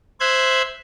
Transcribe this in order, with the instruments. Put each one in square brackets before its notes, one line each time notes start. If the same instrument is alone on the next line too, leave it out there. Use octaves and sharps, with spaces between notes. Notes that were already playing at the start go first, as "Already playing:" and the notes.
[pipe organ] C5 E5 F#6 G#6